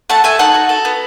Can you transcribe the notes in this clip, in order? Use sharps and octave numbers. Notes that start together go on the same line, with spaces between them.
A3 F#5 A5
A3 E5 G#5
D#4 F#5 A5
F#4
A4
B3